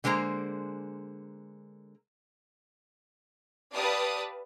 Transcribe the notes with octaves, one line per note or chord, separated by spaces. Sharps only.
D3 G#3 A#3 C5 A#5
G4 B4 D5 F5 A5 D#6